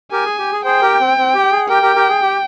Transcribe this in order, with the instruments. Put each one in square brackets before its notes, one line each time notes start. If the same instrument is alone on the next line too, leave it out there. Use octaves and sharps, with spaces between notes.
[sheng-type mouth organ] G4 A#4 [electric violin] G#5
[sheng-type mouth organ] G#4
G4
G#4
[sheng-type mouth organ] G#4 C5 [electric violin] G5
[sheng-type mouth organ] G4 A#4
C4
C4
G4
G#4
[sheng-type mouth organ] G4 A#4 [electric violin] G5
[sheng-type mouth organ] G4 A#4
G4 A#4
G#4
G4